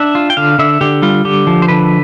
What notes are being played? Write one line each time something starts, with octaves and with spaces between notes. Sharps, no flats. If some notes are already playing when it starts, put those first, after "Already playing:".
Already playing: D4 E5
F4
G5
D3 F5
D3 E5
D3 G4
G3 F4
D3 G4
F3
C5
D3 B4